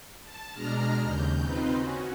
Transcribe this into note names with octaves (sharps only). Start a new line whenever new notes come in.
A5
B2 G#3 D4 A#5 F6
D#2 C#3 G6
C4 D#4 F4 B4 C5
C#4 F#4